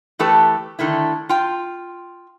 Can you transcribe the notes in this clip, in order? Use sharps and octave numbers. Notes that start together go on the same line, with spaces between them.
E3 A3 G4 A4 B4
D3 D#3 A3 E4
F4 G5